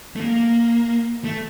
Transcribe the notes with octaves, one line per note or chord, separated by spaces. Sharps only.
A3
A#3
A3